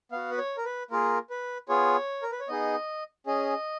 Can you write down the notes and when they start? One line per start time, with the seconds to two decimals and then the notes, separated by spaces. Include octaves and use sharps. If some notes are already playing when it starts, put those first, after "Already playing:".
0.12 B3 F#4 F5
0.31 B4
0.38 C#5
0.57 A#4
0.65 B4
0.91 A#3 F4 G#4 A#4
1.30 B4
1.69 B3 F4 G#4 C#5
2.22 A#4
2.32 B4
2.40 C#5
2.48 B3 D#4 G#4 D#5
3.26 C#4 G#4 D#5